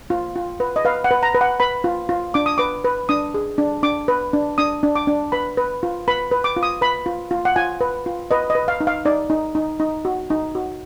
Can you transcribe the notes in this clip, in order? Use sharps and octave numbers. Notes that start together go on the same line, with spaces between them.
F4
F4
B4
D#5
B4 F5
F#5
B4
A#5
B4
F#5
B4 B5
F4
F4
D4 D6
D#6
B4 D6
B4
D4 D#6
G#4
D4
D4 D6
B4
D4
D4 D#6
D4
D6
D4
B4 B5
B4
F4
B4 B5
B4
D6
F4
D#6
B4 B5
F4
F4
F#5
F4 G#5
B4
F4
B4 D#5
D#5
B4
F5
D#4
F5
D#4 D5
D#4
D#4
D#4
F#4
D#4
F#4